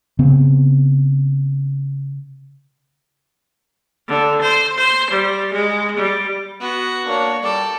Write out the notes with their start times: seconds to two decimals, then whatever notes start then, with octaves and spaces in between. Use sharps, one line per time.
0.19 C#3 B3 C4
4.08 D3
4.42 C5
4.78 C5
5.11 G3
5.53 G#3
5.97 G3
6.61 B3 F#4
7.06 A#3 D4 C#5
7.43 G3 A4 D5 D6